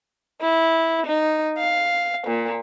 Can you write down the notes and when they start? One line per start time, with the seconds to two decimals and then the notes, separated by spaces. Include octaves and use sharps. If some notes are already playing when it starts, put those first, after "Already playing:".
0.41 E4
1.06 D#4
1.57 F5
2.26 A#2